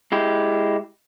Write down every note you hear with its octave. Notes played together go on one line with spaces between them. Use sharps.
G#3 E4 G4